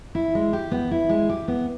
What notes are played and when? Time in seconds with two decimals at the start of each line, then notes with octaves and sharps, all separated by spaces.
0.15 E4
0.35 G#3
0.53 G4
0.71 B3
0.91 E4
1.09 G#3
1.29 G4
1.48 B3